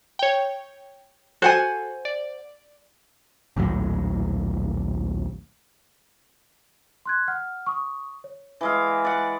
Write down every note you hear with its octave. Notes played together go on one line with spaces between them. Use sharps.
C#5 G5
F#4 A4 C5 F#5 G#5
D5
A#1 D#2 A2 F#3
C6 F#6 G#6
F#5 F6
C#6 D#6
C#5
E3 G#3 F5
D5 F#5